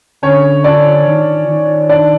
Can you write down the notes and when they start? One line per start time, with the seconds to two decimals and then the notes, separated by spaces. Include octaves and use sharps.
0.23 D3 C#4 C#5
0.64 D4 D5
1.07 D#3
1.48 D#3
1.89 D4 D5